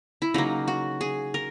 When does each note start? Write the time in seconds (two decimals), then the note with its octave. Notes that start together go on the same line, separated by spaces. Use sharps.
0.22 E4
0.34 C#3 F#3 A#3 D#4
0.68 F#4
1.01 G#4
1.34 A#4